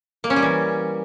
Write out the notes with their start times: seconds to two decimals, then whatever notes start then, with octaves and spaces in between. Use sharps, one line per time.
0.24 A#3
0.30 C#4
0.36 G3
0.42 E3